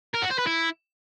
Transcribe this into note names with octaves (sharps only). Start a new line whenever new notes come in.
A#4
F#4
C5
B4
E4